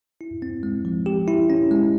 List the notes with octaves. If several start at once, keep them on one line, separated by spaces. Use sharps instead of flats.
E4
C4
G#3
F3
G4
E4
C#4
G#3